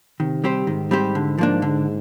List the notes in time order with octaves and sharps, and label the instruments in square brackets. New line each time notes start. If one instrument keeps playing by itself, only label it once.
[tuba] C3 [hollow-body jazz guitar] D#3
[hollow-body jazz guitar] G3 C4 G4 C5
[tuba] G#2 [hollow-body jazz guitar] D#3
[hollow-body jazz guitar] G3 C4 G4 C5
D3
F3 A#3 D4
D3